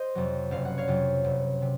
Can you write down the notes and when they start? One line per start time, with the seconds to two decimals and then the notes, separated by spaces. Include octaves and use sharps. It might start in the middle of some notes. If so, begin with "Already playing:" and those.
Already playing: C5 D#5
0.15 F2 C3 F#3
0.51 F#1 F5
0.65 F#5
0.78 C#5 F5
0.87 F2 C3 F#3
1.24 F#1
1.62 C3